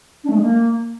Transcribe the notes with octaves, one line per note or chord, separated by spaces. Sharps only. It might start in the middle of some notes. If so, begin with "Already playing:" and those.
D4
A3
G#3
A#3